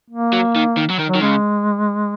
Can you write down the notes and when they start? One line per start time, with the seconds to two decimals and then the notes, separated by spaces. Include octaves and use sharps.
0.10 A#3
0.33 F#3
0.56 D#3
0.77 D#3
0.90 F#3
0.99 D#3
1.09 F#3
1.15 D#3
1.21 C#3 G#3